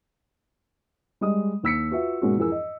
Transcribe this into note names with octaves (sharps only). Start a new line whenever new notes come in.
G3 G#3 D#5 D#6
D#2 E6 B6 C#7
F4 F#4 B4 E5
G#2 B2 G#3 A#3 C#4 F#4
F2 E3 G#4 A#4 E6
D#5